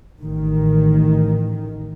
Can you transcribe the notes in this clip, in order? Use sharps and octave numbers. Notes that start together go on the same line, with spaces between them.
A1 D#3